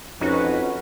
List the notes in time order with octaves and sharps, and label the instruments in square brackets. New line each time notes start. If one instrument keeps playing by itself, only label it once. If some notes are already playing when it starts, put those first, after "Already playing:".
[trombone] F2 [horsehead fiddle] C#4 B4 [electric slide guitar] D#4 [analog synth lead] F#4